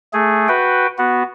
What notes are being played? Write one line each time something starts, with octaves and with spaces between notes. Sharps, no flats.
A3 G#4
F#4 B4 G5
B3 F#4